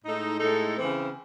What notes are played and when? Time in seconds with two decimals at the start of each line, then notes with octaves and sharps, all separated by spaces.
0.02 A2 G#3 D#4 A4
0.40 A2 G#3 D#4 A4
0.76 C#3 E3 C4